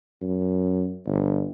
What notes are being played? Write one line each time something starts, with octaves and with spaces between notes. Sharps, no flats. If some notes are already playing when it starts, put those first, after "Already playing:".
F#2
G1